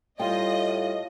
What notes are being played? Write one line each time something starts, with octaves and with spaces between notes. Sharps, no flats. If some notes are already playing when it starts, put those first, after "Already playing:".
A2 G3 F4 D#5 F5 G5